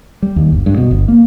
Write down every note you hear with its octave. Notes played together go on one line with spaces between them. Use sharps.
G3
D#2
G1
G2
B2
G1
A#3